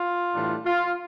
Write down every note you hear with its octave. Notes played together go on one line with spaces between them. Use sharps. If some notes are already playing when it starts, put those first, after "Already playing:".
Already playing: F4
A2 E3 G3 D4
F4